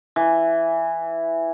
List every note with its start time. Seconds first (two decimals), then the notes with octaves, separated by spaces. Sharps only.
0.16 E3